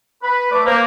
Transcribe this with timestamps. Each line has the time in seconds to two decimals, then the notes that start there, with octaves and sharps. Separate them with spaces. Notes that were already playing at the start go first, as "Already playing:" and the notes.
0.23 B4
0.52 A3 B4 D5 D6
0.66 A#3 C5